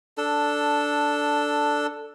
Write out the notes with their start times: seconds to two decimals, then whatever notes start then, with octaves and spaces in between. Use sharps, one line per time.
0.17 D4 A4